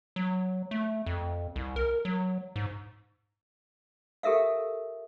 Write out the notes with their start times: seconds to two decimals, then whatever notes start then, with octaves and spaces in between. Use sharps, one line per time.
0.16 F#3
0.71 A3
1.06 F2
1.56 C2
1.76 A#4
2.05 F#3
2.56 G#2
4.23 G4 A4 A#4 E5 F5